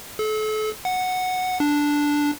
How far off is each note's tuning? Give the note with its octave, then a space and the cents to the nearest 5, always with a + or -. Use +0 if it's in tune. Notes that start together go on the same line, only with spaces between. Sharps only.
A4 -35
F#5 -5
D4 -5